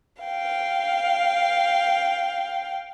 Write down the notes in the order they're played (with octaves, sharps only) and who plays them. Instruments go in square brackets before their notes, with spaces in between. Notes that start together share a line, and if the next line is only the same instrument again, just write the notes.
[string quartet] F5 G5